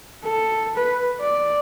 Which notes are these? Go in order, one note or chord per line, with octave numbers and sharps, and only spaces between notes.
A4
B4
D5